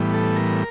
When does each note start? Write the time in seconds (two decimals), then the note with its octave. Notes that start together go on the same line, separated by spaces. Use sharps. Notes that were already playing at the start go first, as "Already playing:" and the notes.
Already playing: A2 E3 G3 B3
0.13 A4
0.36 A#4